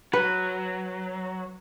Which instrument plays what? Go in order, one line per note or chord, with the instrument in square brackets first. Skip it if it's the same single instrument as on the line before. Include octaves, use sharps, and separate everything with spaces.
[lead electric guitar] F#3 [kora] B4